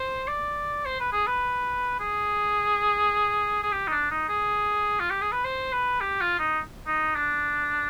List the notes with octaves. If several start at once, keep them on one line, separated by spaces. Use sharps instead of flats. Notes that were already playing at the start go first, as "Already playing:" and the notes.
Already playing: C5
D5
C5
B4
G#4
B4
G#4
G#4
G4
D#4
D4
D#4
G#4
F4
G4
G#4
B4
C5
B4
G4
F4
D#4
D#4
D4